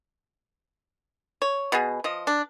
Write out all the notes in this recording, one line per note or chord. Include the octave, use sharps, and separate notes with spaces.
C#5
B2 B3 G#4
F3 D#5
D4